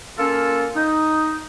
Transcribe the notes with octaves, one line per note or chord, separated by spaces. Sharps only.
A#3 C#4 F4 A4
D#4